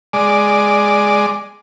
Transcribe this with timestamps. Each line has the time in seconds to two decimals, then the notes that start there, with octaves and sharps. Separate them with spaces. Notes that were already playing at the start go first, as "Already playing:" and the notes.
0.13 G#3 D5